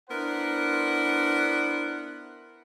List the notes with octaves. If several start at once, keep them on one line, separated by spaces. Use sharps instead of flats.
B3 D4 E4 A#4 C5 F#5